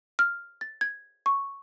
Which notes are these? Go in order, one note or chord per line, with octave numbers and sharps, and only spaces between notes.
F6
A6
G#6
C#6